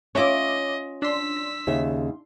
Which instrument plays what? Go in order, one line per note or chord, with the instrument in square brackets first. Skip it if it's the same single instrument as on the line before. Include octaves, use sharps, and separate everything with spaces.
[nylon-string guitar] C#4 F4 [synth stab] C#5 E5 D6 [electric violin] D#5
[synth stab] D4 C6 [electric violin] E6 B6
[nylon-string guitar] D#2 C#3 E5